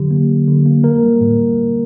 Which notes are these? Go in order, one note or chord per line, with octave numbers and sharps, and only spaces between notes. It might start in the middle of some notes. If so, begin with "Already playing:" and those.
Already playing: D3 F#3 G4
A#3
D3
D3
A#3
A#3 A#4
G3
A2